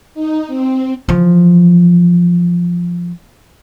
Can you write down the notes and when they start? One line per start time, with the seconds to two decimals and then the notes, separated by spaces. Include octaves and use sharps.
0.14 D#4
0.47 C4
1.09 E3 F3